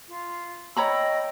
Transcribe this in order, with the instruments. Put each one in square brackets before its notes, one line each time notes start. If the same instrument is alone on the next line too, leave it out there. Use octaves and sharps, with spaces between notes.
[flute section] F4
[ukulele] C#5 A#5 B5 [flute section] D#5 G5 E6